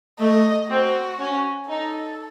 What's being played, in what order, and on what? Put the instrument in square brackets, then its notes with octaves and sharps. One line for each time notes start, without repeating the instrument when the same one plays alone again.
[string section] A3 [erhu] D#5
[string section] C4 [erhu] F#4
[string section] C#4
[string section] D#4 [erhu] A4